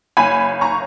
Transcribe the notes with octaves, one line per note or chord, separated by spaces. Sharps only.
F#1 G#5 B5
A#5 C#6